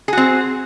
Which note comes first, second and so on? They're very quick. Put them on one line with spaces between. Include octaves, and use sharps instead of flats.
G#4 F#4 C4